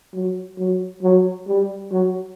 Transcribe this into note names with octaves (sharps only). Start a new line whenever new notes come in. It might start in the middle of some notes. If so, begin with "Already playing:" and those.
F#3
F#3
F#3
G3
F#3